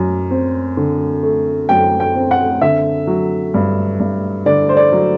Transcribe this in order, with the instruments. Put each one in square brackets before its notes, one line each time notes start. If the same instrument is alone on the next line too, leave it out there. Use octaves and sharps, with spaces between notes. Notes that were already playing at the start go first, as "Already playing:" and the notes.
Already playing: [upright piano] F#2
C4
D3
A3
F#2 G5
G5
C4
F#5
D3 E5
F#3
G2
G2
D3 D5
C5
D5
F#3